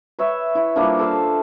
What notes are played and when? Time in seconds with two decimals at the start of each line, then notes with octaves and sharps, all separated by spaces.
0.19 B4 C#5 E5
0.55 E4
0.76 F3 G3 A#3 D4
0.99 A4 C5 F5